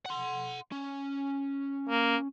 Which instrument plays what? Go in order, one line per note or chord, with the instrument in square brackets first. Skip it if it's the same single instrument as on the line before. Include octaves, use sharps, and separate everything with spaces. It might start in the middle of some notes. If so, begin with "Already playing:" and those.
[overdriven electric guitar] F#5 C6
C#4
[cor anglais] A#3